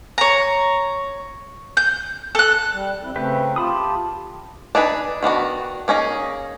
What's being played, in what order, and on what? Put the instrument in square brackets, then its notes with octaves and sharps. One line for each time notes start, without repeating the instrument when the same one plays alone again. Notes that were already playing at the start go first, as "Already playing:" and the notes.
[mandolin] C#5 A#5
G6
A4 F#6
[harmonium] G3
F2 C4 E4
[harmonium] C#3 A3 C4 [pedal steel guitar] G4 B4 E5
[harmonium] F4 G4 [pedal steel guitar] A5 B5 D#6
[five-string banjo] D4 D#4 G#4 B4
D#3 B3 D4 F#4
A#3 C#4 D#4 G#4